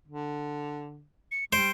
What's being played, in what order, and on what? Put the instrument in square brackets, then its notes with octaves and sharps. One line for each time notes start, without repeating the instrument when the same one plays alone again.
[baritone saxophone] D3
[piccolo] C#7
[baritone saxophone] G3 [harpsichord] C5 [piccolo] D7